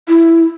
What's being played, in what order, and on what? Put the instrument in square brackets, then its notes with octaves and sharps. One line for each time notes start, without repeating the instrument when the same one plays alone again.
[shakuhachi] E4